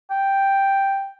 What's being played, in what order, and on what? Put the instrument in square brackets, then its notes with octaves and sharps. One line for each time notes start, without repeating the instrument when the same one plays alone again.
[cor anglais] G5